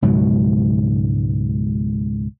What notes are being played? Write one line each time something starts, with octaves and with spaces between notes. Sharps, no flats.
C#2 G#2 B2 F#3